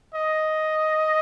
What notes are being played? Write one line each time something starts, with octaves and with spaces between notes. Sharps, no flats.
D#5